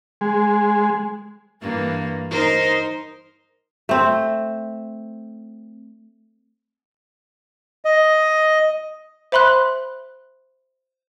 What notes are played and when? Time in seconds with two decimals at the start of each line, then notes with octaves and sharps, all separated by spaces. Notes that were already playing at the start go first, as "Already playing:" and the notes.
0.21 G#3
1.62 G2 E3 A#3
2.30 D#4 A#4 C5
3.89 A3 C4
7.85 D#5
9.32 C5 E5 B5 C6 F#6